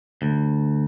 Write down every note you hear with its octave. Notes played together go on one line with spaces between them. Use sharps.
D2